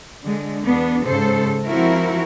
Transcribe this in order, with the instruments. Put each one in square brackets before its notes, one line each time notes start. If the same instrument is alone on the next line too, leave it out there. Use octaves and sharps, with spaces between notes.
[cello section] D3 G#3
E2 B3 D4
G#2 C#3 A4 C5
F3 C4 E4 F#4 A#4